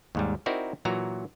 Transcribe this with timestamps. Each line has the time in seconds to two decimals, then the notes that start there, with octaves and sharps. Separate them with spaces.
0.15 D#2 G#2 G3
0.46 C4 D#4 E4 F#4 A#4 D5
0.85 A#2 E3 F#3 F#4 A#5